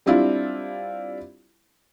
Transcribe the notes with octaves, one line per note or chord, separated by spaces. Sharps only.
G3 C4 D4 E4 F4